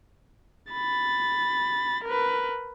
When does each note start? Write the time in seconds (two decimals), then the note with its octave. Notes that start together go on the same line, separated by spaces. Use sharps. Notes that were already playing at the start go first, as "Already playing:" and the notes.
0.73 B5 A6
2.04 A#4 B4